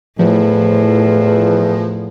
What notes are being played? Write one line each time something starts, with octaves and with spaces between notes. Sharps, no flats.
E2 A2 F3